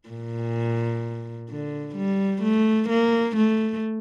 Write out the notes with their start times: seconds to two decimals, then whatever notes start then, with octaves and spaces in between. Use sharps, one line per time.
0.09 A#2
1.49 D3
1.96 G3
2.43 A3
2.89 A#3
3.36 A3